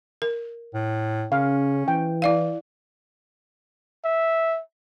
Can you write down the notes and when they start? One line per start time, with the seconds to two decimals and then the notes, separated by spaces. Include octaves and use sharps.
0.22 A#4
0.74 A2
1.32 C#3 C#4 F5
1.88 E3 G5
2.22 E4 D5 F5
4.05 E5